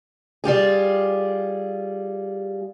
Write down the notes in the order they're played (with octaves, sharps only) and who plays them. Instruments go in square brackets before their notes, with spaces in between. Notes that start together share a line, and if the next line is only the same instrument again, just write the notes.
[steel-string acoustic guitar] G3 F4 G4 G#4